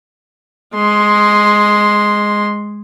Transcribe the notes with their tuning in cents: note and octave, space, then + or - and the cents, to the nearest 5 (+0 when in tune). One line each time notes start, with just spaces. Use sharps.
G#3 +0 C6 +0